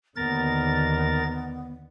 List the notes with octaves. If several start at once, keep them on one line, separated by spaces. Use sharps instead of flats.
D#2 D3 B3 A#4 A6